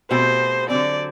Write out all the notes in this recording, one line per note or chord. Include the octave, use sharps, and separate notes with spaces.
B2 A3 C4 G4 C5
D3 F#3 C4 D5